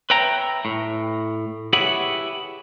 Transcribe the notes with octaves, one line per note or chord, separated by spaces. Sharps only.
B4 C#5 E5 G5 A#5
A2
E4 G4 G#4 B4 C#5 F#5